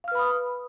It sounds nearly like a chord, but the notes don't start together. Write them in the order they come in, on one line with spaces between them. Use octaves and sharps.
F5 F6 B4 B5 D#6